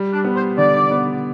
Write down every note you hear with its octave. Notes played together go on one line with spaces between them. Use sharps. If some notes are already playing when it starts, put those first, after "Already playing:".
Already playing: G3
D4
B3
C5
D3 D5
B3